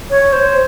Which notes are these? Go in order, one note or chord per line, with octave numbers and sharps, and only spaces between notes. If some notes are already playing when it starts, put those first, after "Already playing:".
C#5
C5